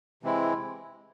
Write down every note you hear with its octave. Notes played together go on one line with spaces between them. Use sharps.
C3 E3 G#3 C4 E4